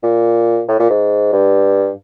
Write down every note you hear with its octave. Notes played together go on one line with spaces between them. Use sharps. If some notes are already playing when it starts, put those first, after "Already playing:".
A#2
A2
A#2
G#2
G2